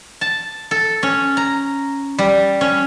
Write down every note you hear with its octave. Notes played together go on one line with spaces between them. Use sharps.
A5
A4
C#4
A#5
G3
C#4